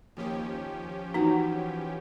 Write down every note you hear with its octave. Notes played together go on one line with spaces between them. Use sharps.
D#2 F3 C#4 G4
E3 D#4 F#4